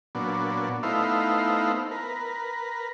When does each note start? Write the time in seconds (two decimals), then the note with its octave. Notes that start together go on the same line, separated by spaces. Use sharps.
0.15 A#2 F#3 B3 D4
0.83 A3 B3 D#4 E4 C5 F5
1.91 A#4 B4